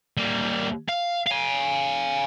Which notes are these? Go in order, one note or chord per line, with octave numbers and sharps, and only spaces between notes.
G3 A#3
F5
F5 G#5